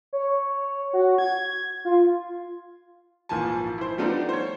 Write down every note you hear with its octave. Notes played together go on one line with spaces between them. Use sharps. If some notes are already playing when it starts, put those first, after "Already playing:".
C#5
F#4
G#6
F4
G#1 A#2 E3 F3 G#5 A5
E4 C5
F3 G3 A3 B3 D4 D#4
C5 C#5